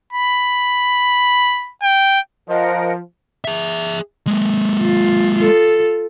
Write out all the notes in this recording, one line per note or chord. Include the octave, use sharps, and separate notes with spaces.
B5
G5
F3 A#4 D#5 F#5
G#4 E5
G#3 A#3
F4
F4 A4